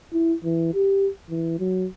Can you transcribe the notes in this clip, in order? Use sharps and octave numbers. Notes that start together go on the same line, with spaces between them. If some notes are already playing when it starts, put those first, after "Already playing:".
E4
E3
G4
E3
F#3